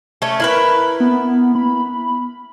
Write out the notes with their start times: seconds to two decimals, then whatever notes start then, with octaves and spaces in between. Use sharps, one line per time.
0.22 A3 C#4
0.40 E4 A#4 B4
1.00 B3
1.55 B5